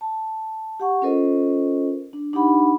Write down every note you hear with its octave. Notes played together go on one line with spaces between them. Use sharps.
A5
G4 F#5 C#6
C#4 F4 A4 A#4 C5 D#5
D4
D4 D#4 G4 F#5 B5